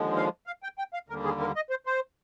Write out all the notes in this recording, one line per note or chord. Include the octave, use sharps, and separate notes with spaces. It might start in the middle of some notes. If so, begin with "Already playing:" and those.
Already playing: D#2 D3 F3 G#3
F5
F5
G5
G5
F5
D#2 D3 G3 A#3 A#4
G#4
A#4
D#5
C5
C5